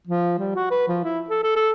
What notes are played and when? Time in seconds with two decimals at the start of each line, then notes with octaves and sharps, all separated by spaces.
0.07 F3
0.39 G3
0.56 F#4
0.71 B4
0.88 F3
1.04 E4
1.30 A4
1.44 A4
1.56 A4